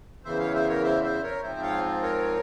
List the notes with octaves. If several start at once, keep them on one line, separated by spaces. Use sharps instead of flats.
E2 C#3 E3 C5 E5
C#5 F5
C5 E5
A#4 C#5
C5 E5
C5 E5
A#4 C#5
G#2 F3 C4 F4 C5 E5
C#5 F5
A#4 C#5